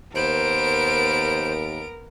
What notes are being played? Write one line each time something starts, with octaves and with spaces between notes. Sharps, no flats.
D#2 B3 A#4 C5 D7